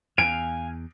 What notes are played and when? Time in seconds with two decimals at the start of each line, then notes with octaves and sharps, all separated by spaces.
0.18 E2 F5 G#5 D7